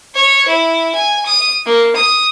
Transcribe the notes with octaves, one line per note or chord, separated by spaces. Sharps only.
C#5
E4
G#5
D#6
A#3
D#6